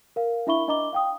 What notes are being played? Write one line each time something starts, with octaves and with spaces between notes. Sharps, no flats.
A#4 F5
D4 E4 E5 B5 C#6 G7
D4 D#5 A#5 D6 G7
F5 G5 D#6